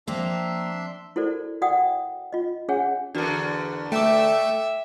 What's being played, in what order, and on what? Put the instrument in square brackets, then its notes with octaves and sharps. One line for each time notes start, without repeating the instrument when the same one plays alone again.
[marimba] F3 [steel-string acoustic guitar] A#3 C4 A#4 [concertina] D4 E5 C6
[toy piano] E4 F#4 A4 A#4 C5 D5
F#4 D5 F#5 G5 D#6
F4 D#5
C#4 G#4 C#5 F#5 G#5
[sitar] E2 D3 [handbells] D4 F#4 A#4
[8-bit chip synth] A3 [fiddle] E5 [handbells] G5 D6